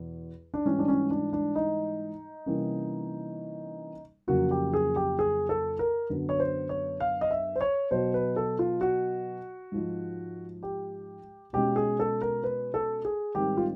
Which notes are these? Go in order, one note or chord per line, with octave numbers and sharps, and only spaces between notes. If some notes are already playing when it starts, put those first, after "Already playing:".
Already playing: E2 B2
D4
G#2 E3 G3 C#4
D4
C#4
D4
D4
D#4
C3 E3 G3 A#3 C#4
F2 C#3 F#3 A#3 C#4 F#4
G4
G#4
G4
G#4
A4
A#4
F#2 D3 F#3 B3
C#5
C5
C#5
F5
D#5
E5
C5
C#5
B2 F#3 B3 C5
B4
A4
F4
F#4
G#2 F3 G#3
G4
B2 G#3 C#4 G4
G#4
A4
A#4
B4
A4
G#4
G#2 D#3 G3 C4 G4
F4